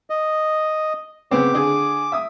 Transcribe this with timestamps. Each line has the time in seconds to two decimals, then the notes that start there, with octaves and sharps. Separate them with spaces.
0.10 D#5
1.31 C#3 B3 C4 D6
1.54 D3 G#4
2.12 E5 D#6